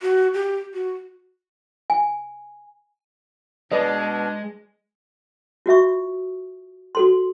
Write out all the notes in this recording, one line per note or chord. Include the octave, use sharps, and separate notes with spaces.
F#4
G4
F#4
G#5
B2 G#3 D4 B4 D5 D#5
F4 F#4 E5 C#6
F#4 A4 C6